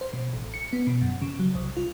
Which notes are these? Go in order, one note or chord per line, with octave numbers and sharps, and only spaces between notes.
C5
B2
A1
C#7
B3
B2
F#2
C#3
F#3
C2
F4